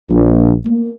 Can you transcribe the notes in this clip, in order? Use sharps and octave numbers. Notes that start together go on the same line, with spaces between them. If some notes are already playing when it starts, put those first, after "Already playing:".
A#1
A#3